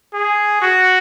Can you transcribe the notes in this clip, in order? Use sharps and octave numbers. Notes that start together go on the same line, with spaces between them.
G#4
F#4